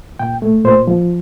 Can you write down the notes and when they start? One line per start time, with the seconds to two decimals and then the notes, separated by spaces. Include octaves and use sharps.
0.19 A#2 G5
0.42 A3
0.65 A#2 C5
0.88 F3